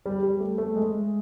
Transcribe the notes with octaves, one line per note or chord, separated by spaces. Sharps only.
G3
G3
A3
A3
G#3